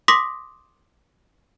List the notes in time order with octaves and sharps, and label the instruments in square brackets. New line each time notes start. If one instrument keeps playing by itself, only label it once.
[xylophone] C6 D6 D#6 A#6 B6